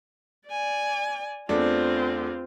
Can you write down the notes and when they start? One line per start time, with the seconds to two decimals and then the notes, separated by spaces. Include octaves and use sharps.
0.49 D5 G#5
1.49 E2 A3 C4 D4 F4